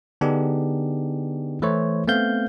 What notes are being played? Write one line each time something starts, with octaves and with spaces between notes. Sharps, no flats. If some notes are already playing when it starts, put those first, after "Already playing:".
D3 B3 D4 D#4 G4 G#4
E3 A3 E4 C5 C#5
A3 B3 C4 F5 G6